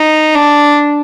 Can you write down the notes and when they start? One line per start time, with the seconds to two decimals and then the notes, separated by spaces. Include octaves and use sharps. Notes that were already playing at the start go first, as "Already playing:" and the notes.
Already playing: D#4
0.35 D4